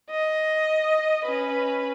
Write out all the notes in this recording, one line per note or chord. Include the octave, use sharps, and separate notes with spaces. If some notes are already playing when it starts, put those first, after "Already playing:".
D#5
C#4 B4